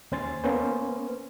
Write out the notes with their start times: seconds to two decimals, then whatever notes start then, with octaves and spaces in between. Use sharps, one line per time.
0.12 D#2 C#4 C5 G#5 C6 A6
0.44 A#3 B3 C#4 B4 C5